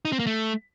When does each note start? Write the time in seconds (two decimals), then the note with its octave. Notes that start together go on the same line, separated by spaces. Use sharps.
0.05 D#4
0.12 C4
0.19 A#3
0.27 A3